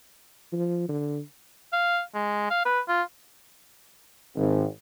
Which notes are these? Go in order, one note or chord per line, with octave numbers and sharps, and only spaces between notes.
F3
D3
F5
G#3
F5
B4
F4
G#1